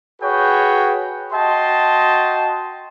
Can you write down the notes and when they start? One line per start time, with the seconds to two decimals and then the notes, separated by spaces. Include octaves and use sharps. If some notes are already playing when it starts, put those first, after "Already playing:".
0.22 F#4 G#4 B4 C#5 G5
1.33 F#4 D#5 G5 A5 C6